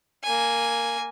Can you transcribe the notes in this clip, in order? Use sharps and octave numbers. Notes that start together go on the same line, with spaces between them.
A#3 G#5